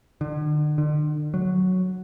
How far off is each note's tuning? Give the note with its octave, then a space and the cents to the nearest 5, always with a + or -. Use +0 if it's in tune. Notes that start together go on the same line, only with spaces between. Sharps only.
D3 +40
D3 +45
F#3 +0